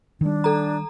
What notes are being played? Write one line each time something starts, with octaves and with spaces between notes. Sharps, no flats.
D#3 G3 D4
A4 A#5